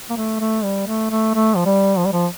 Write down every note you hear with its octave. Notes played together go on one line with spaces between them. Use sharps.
A#3
A3
A3
G3
A3
A3
A3
F3
G3
F3
G3
F3